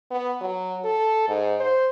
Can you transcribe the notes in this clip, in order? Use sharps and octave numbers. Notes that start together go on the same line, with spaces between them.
B3
F#3
A4
G#2
C5